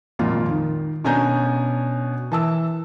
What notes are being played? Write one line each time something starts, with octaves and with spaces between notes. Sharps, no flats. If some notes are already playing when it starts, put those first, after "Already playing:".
G#1 F2 A#2 F4
D#3
B2 C#4 D4 G#5 A#5 G6
E3 A5 E6